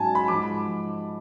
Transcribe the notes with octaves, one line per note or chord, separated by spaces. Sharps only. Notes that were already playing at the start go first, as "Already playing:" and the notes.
Already playing: G#2 F#3 C#4 G#5 A5
B5
G#2 F3 G#3 D6